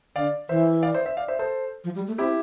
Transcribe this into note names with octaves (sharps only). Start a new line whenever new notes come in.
D3 D5 F5
E3 C5 E5
D5 F5
C5 E5
C5 E5
D5 F5
C5 E5
A4 C5
F3
G3
A3
C4 E4 G4